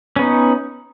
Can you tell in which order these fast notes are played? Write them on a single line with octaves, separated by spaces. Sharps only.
C#4 B3 D#4